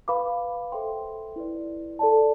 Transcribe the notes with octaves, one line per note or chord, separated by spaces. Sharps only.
B4 F5 B5 D6
A4 C5 E5 G5 C6
E4 B4 D5
A4 D5 A5